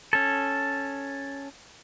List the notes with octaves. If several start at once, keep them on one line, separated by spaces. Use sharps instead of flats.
C#4 A4